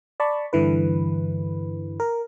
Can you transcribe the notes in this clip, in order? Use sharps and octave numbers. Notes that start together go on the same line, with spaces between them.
D5 A5 B5 C#6
G2 D3 E3 B4
A#4